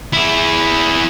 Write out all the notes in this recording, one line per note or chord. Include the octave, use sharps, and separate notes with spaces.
E4 G#4